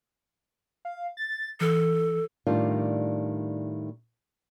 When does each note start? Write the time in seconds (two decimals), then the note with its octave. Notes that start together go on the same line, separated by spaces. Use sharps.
0.85 F5
1.17 A6
1.61 E3 A4
2.47 A2 D#3 G3 D4 F4